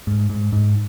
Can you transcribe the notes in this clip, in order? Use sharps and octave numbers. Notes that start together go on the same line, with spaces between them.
G#2
G#2
G#2